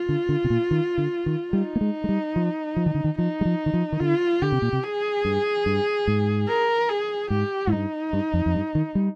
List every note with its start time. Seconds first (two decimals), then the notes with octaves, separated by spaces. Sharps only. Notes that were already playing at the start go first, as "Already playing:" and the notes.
Already playing: F4
0.09 D3
0.29 D3
0.44 C3
0.50 A#2
0.71 D#3
0.98 D3
1.26 D#3
1.53 G3 D#4
1.76 A#3
1.81 G#3
2.04 G#3
2.09 G3
2.36 F3
2.76 F3
2.86 D#3
2.95 D3
3.04 D#3
3.18 F3 D#4
3.41 G3
3.45 F3
3.66 D#3
3.74 F3
3.92 D#3
4.00 D3 F4
4.42 D3 G4
4.52 C3
4.62 A#2
4.73 C3
4.83 G#4
5.25 G2
5.66 G2
6.08 G#2
6.48 A#4
6.89 G#4
7.30 G#2 G4
7.67 G#2
7.71 G2 D#4
8.13 G2
8.34 F2
8.46 F2
8.55 G2
8.75 D#3
8.95 G3